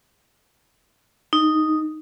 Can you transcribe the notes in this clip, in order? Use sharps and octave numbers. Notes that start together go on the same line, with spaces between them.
D#4